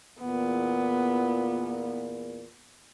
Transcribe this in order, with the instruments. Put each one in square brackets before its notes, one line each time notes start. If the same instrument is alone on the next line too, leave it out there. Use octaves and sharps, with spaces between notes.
[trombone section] E2 A#2 [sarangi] B3